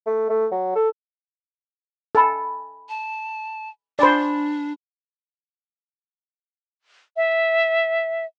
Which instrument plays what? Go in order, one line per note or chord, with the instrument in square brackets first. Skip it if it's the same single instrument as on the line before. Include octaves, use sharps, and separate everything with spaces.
[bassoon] A3
A3
F#3
A4
[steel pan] A4 [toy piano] D#5 G#5 B5
[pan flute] A5
[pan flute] D4 [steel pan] C5 D5 [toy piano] D#5 G#5 B5
[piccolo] E5